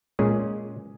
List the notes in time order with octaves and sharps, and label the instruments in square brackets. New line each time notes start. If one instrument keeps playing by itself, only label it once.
[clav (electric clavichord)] A#2 G#3 C#4 G#4